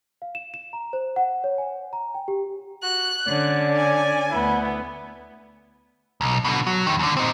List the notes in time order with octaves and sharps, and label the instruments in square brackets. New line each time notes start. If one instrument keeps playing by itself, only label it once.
[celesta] F5
E7
E7
A#5
C5
F#5
C#5
G#5
A#5
G5
G4
[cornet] F#4 [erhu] F#6
[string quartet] D3 C#4 [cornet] D5
[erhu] G#5
[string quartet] D2 B3 [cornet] E4
[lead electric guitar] B1
B2 D3
F#3
E2 D#3
D#2 D3
C4 D#4